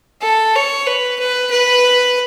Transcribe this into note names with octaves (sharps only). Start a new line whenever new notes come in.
A4
C#5
B4
B4
B4